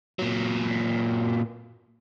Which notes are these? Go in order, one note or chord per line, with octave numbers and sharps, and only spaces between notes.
A#2 F#3